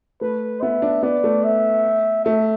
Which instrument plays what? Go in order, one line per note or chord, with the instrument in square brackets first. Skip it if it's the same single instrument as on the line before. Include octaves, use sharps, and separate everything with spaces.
[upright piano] A3 [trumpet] B4
[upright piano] B3 [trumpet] E5
[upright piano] D4
[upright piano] B3 [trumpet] D5
[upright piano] A3
[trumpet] E5
[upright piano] A3 [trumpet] E5